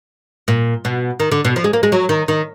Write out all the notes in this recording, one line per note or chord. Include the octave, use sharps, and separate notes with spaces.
A#2
B2
D#3
D3
B2
F3
G#3
A#3
G#3
F#3
D#3
D#3